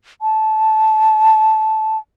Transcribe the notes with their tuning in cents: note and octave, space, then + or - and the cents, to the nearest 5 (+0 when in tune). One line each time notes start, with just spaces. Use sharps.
A5 -15